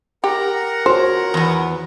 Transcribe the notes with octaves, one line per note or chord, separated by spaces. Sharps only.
G4 A#4 F#5 A#5
F4 F#4 C5 C#5
E2 B3